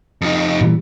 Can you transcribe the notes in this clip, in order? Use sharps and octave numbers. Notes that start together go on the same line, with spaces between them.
F2 D#4
A#2 E3 G3